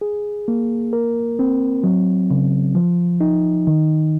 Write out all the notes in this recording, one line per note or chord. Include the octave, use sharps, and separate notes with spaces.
G#4
A#3
A#4
C4
F#3
C#3
F3
D#4
D#3